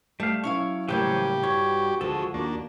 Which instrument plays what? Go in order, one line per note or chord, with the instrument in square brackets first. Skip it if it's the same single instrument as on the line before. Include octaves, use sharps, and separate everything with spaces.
[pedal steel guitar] G3 F5 [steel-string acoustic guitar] A3
[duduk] F#3 [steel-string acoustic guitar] C#4 E4 F5 [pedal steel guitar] C#6
[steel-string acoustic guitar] A2 C#3 A#3 [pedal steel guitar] E3 C5 C#5 [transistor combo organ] G3 G4
[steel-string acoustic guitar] G2 [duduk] F#4 [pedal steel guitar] C#5
[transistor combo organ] D2 G#3 [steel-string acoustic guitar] F3 [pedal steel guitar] A4
[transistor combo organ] D#2 D4 [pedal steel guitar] A#3